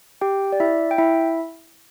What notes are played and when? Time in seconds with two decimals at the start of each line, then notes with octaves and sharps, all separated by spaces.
0.21 G4 G5
0.53 D5
0.60 E4 E5
0.91 G5
0.98 E4 E5